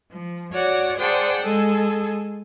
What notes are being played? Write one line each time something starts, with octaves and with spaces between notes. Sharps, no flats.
F3
F#4 C#5 D5 F#5
G#4 C5 D5 F#5 G5 A5
G#3 G#4 A4